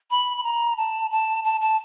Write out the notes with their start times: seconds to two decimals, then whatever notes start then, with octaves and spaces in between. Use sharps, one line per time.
0.11 B5
0.37 B5
0.43 A#5
0.77 A5
1.11 A5
1.44 A5
1.61 A5